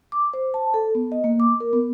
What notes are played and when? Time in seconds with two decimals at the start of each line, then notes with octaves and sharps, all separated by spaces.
0.12 D6
0.34 C5
0.54 A5
0.74 A4
0.95 B3
1.12 D#5
1.24 A#3
1.40 D6
1.60 A#4
1.73 B3